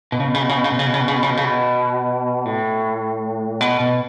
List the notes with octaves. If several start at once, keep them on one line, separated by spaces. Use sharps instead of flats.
B2
C#3
B2
C#3
B2
C#3
B2
C#3
B2
C#3
B2
C#3
B2
C#3
B2
C#3
B2
C#3
B2
A2
B2
B2